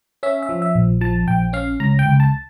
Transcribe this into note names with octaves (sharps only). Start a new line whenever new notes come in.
C#4 E5
E5
F3
E5
A#1
F3 A5
A#1 G5
C#4 F5
C#2 A#5
G5
C#2
A5